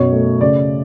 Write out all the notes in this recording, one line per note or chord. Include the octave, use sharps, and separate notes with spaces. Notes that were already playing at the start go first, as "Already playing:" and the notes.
Already playing: F#2 B2 C#5
A3
C#3 D5